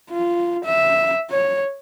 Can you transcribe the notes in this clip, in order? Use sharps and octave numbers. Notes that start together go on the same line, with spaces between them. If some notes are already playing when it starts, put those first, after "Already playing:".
F4
E5
C#5